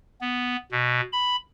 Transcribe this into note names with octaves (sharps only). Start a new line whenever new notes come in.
B3
B2
B5